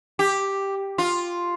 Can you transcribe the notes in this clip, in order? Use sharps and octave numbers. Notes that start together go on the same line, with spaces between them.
G4
F4